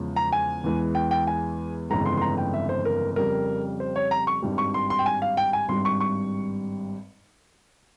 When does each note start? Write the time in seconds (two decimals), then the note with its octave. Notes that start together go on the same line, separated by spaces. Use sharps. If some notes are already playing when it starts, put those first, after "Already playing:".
Already playing: E2 C#3 F3 G#3
0.16 A#5
0.32 G#5
0.64 E2 E3 G#3
0.95 G5
1.11 G5
1.27 G#5
1.90 G1 F2 C#3 E3 G#3 A#5
2.06 C6
2.17 C6
2.21 A#5
2.38 G5
2.54 E5
2.69 C5
2.85 A#4
3.16 F2 C#3 G3 A#4
3.80 C5
3.96 C#5
4.11 A#5
4.27 C#6
4.42 G#1 G2 G3
4.58 C#6
4.74 C6
4.90 C6
4.99 G5
5.06 G#5
5.22 F5
5.37 G5
5.53 G#5
5.68 G#1 G2 G3 C6
5.85 C#6
6.00 C#6